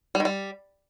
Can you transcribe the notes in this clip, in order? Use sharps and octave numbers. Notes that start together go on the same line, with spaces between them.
G3
D#3
G3